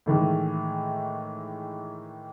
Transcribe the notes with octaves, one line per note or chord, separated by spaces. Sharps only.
A2 D#3 E3 G#3